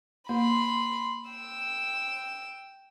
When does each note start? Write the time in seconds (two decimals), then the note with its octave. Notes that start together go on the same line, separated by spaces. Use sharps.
0.29 A#3 B5 C6
1.31 G5 E6